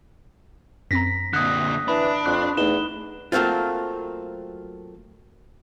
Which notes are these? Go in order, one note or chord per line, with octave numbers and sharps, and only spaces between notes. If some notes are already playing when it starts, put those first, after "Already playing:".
F#2 C4 A#5 A#6 B6
A#2 D3 D#6 F#6
E3 D4 B5
F2 C6 C#6 F#6
E2 A3 D#4 E7 G7
F#3 A3 A#3 C4 F4